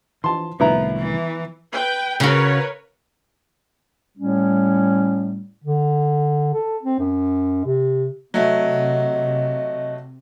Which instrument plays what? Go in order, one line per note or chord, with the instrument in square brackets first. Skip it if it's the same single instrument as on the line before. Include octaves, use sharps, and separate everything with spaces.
[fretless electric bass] E3 F3 [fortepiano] A5 C6
[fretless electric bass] C2 A2 D#3 [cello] F3 [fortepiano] B3 E4 A#5
[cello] E3
[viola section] B4 G5
[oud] C#3 F#4 [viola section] A#4 B4 C#5
[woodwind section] A2 G3 A3 C#4
[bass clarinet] D3
A4
C4
F#2
C3
[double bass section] C3 [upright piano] F#3 A3 [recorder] D#5